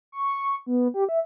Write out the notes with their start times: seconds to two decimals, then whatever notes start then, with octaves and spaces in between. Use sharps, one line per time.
0.12 C#6
0.66 B3
0.94 G4
1.09 E5